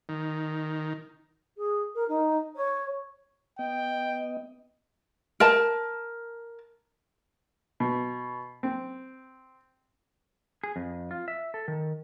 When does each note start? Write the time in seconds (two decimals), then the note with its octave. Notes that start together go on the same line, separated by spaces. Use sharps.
0.09 D#3
1.57 G#4
1.94 A#4
2.08 D#4
2.55 C#5
3.59 B3 D#5 G5
5.40 A#4 A5
7.80 B2
8.63 C4
10.64 G#4
10.76 F2
11.11 F4
11.28 E5
11.54 A4
11.68 D#3